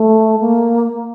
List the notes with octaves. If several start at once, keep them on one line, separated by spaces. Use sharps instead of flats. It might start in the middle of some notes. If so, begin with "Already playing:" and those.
Already playing: A3
A#3